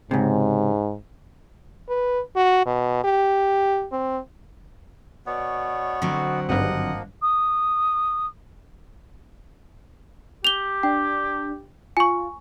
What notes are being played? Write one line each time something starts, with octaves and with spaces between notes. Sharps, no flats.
C#2 G#2 C3
B4
F#4
B2
G4
C4
B2 B3 C#5 D5
D3 F#3 C4 F#4 F#5
G#1 G2 F3 A#3 D#5 F#5
D#6
G4 F7 G7
D4 G5
F4 G#5 C#6